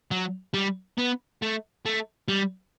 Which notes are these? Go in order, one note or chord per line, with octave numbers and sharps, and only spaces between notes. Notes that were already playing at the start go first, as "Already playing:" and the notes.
F#3
G3
B3
A3
A3
G3